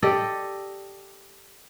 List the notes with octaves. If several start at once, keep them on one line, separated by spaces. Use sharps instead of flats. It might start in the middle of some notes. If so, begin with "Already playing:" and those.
G4 A4 D5 D#5